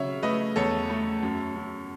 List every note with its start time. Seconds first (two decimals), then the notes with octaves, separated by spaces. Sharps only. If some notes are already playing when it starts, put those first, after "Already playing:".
Already playing: C#3 F#3 C#5 E5
0.23 A3 B4 D#5
0.56 E2 A4 C#5
0.90 A3
1.23 F#2
1.56 F#2